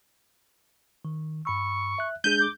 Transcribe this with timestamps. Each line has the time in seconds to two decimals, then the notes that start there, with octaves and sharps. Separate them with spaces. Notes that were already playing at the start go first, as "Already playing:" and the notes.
1.05 D#3
1.45 G2 B5 C#6 E6
1.98 E5 F#6
2.24 G#3 D4 G#4 G6 D#7
2.40 D6